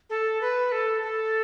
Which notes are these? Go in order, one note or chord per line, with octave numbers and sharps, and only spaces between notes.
A4
B4
A4
A4